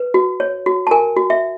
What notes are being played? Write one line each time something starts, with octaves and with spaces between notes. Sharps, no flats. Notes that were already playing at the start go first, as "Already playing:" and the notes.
Already playing: B4
F#4
C#5
F#4
A5
A#4 G#5
F#4
E5